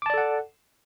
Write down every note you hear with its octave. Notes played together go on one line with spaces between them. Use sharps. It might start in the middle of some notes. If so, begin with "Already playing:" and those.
A4 D5 F#5 A5 D6